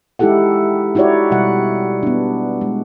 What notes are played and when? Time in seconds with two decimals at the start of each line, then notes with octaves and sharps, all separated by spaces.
0.19 G#3 D#4 E4 G4 A4 F#5
0.95 D#4 E4 F#4 G4 C#5 D5
1.31 B2 G3 F#5
2.03 B3 D4
2.61 G#3